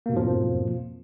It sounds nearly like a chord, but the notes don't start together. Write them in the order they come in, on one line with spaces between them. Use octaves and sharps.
A#3 B2 G#2 F3 F2